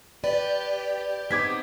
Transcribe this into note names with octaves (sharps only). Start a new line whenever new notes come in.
G4 B4 D5
B3 C4 D#4 D6 G#6 B6